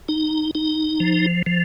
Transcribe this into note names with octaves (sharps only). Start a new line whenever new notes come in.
D#4
D#4
F3
F3